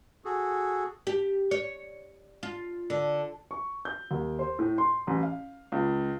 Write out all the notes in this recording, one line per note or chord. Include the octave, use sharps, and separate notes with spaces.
F#4 G#4 A4
G4
C#5
F4
D3
C#6
G6
D#2
C5
A2
C6
A1
F5
C#2